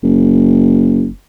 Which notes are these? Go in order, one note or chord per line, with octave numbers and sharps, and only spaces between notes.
F#1